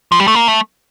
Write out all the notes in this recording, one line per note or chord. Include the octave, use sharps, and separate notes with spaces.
F3
G3
A3
A#3
A3